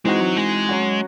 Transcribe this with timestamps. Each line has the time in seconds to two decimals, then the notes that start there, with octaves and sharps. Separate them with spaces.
0.05 E3 G#3 C4 D#4 F#4
0.21 F#3
0.37 G#3
0.69 F#3 C#4 F#4